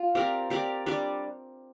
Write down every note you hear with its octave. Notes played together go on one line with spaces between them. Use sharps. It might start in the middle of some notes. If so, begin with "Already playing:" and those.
Already playing: F4
C4 G4 A#4 D5
C4 G4 A#4 D5
G3 D4 G4 D5